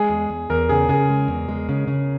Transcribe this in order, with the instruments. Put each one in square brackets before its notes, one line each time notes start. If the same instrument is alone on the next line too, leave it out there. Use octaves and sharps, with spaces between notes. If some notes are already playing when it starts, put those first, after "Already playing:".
Already playing: [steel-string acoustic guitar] G#3 [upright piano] G#4
[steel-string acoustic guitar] E2
E2
[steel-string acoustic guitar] E2 [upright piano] A#4
[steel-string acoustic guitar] C#3 [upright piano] G#4
[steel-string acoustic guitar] C#3 [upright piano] G#4
[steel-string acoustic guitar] G#3
E2
G#3
C#3
C#3